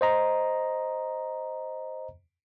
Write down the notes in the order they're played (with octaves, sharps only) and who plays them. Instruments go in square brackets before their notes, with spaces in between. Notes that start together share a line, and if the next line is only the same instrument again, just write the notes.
[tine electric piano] C5 D#5 A#5